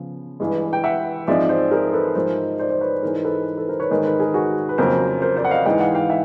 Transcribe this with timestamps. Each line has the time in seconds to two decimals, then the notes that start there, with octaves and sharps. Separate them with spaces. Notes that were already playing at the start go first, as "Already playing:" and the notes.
Already playing: C#3 F3 B3
0.40 G2 E3 G#3
0.73 G5
0.84 E5 F#5
1.28 G#2 F3 G#3 C4 D5 E5
1.49 C5 D5
1.71 G#4 A#4
1.93 A4 B4
2.15 G#2 F3 G#3 A#4 C5
2.59 C5 D5
2.70 C5 D5
2.81 B4 C#5
3.03 G#2 E3 G#3 A#4 C5
3.16 C5
3.24 A4 B4
3.57 A4 B4
3.69 A#4 C5
3.80 B4 C#5
3.90 G#2 D#3 G#3 A#4 C5
4.05 A4 B4
4.20 G#4 A#4
4.34 F#4 G#4
4.69 B4
4.78 F2 C#3 F#3 A#3 A#4 C5
5.22 A#4 C5
5.36 C5 D5
5.45 F#5
5.51 D#5 F5
5.65 G#2 E3 G#3 F5 G5
5.80 F#5 G#5
5.95 F5 G5
6.09 E5 F#5